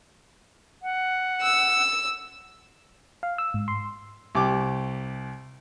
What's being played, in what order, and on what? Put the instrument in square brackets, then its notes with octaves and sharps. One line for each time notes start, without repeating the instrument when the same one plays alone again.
[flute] F#5
[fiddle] E6
[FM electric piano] F5
E6
G#2
C6
[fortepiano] C2 G4 D6